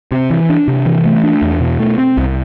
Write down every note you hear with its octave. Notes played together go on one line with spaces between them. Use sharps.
C3
E3
D4
C3
E3
A3
D4
E2
B2
A3
C4
C2